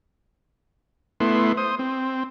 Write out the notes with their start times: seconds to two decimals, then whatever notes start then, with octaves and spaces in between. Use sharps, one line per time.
1.20 A3 B3 E4 C6
1.57 C5 D#6
1.79 C4